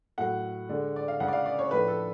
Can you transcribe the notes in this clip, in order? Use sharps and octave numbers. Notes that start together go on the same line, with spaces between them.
A2 F#3 A3 F#5
D3 G#3 D4
D5
F5
C#3 G#3 D4 F#5
D5
F5
D5
C#5
A2 F3 A3 D4 B4
A4